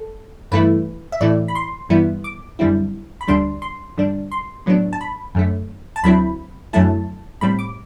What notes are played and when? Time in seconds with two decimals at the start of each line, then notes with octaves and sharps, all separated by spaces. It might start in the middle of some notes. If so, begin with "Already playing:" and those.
Already playing: A4
0.51 G2 E3 A3 E4 B4
1.12 E5
1.20 A2 E3 A3 E4 D5
1.48 B5
1.55 C6
1.89 G2 E3 G3 B3 E4
2.24 D6
2.59 F#2 D3 G3 C4 E4
3.21 B5
3.28 D2 D3 G3 D4 C6
3.62 C6
3.97 G2 D3 G3 D4
4.32 C6
4.66 A2 F#3 B3 D4
4.93 A5
5.01 B5
5.35 F#2 D3 A3
5.96 A5
6.03 D2 D3 F#3 C4 E4 B5
6.73 F#2 D3 F#3 A3 E4 A5
7.41 A2 G3 C4 B5
7.59 D6